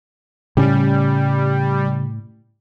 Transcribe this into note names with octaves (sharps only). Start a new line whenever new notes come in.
A2 C#3 G3 C#4